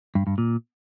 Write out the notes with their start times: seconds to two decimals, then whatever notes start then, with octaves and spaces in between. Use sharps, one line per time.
0.15 G2
0.27 G2
0.38 A#2